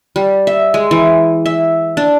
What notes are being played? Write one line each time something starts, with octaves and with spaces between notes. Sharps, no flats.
G3
E5
G#3
E3
E5
D4